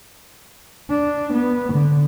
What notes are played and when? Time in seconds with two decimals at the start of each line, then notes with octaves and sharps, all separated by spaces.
0.90 D4
1.33 B3
1.73 D3